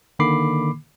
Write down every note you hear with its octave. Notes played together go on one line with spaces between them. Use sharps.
D3 D#3 A#3 B5 D6 C7